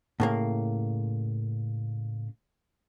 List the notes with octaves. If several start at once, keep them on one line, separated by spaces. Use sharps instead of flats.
A2 C#3 A#3